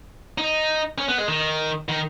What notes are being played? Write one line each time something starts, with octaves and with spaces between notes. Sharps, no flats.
D#4
C#4
B3
G#3
D#3
D#3